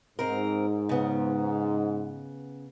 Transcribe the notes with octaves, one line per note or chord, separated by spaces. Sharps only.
G#2 C4 A#4
C#3 B3